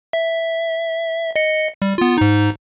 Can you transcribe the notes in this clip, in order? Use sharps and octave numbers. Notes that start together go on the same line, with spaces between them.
E5
D#5 C#7
G3
B3 F4
G#2 D#4